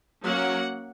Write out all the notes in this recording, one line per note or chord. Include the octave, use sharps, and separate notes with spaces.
F#3 A#3 C#4 F#5